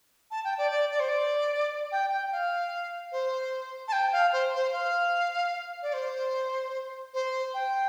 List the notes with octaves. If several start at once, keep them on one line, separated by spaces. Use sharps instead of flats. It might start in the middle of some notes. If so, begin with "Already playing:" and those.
A5
G5
D5
D5
D5
C5
D5
G5
G5
F5
C5
A5
G5
F5
C5
C5
F5
D5
C5
C5
G5